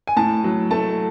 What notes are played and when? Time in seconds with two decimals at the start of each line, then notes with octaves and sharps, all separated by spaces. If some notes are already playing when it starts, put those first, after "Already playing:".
0.07 G#5
0.17 A2 A5
0.44 F#3
0.71 A3 A5